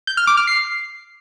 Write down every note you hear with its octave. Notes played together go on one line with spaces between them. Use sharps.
G6
F6
D6
F6
C7